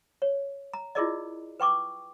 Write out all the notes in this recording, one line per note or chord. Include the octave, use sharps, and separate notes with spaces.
C#5
A#5
E4 F4 G#4 A#4 D5 D#5
B4 G5 C#6 D6